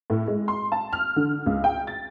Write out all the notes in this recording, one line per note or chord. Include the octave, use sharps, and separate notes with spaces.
A2
G#3
C6
A5
F6
D3
C#2
G5
A6